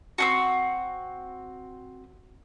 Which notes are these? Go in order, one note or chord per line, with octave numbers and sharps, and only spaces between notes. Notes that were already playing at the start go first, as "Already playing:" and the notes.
C4 D4 F#4